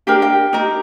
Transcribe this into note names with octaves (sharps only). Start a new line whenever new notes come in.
D4 G4 A#4 G5
G5
D#4 G4 A#4